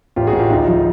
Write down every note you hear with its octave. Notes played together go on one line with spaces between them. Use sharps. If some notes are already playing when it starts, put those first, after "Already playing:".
A1 F4 G4
F#4 G#4
A1
F4 G4
D2 D#4 F4
F3